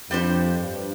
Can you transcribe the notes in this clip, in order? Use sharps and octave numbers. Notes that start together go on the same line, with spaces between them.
F2 G3 D4 G4 C5
G2